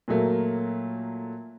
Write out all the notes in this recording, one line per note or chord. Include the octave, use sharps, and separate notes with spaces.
A#2 F#3 A3 A#3